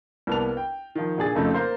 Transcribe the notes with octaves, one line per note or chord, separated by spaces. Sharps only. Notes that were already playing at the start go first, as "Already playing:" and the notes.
C2 A#3 B3 A5 F7
G5
D#3 F3
A#2 D3 G#4 A6
F2 C#3 F3 A3 C4 D#4
A#3 C5 F5 A#5